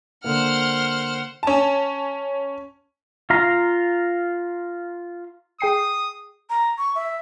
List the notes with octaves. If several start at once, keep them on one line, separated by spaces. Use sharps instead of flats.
D3 A#3 C5 F#5 F6
C#4 A5
F4 F5 A#5
G#4 G5 D#6 C7
A#5
C#6
E5